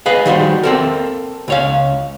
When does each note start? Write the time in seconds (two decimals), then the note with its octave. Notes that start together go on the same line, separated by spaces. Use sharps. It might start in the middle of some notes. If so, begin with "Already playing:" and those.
0.06 G#4 B4 D#5 F5
0.25 D#3 G3 F#4 C5
0.63 C4 A4 A#4
1.48 C#2 C#5 F5